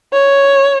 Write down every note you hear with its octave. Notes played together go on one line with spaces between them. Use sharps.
C#5